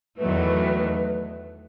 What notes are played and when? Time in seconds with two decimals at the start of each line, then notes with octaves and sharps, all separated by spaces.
0.18 E2 D#3 F#3 A3 B4